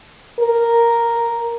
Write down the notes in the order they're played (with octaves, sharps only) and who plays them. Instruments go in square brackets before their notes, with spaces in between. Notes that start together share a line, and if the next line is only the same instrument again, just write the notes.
[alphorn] A#4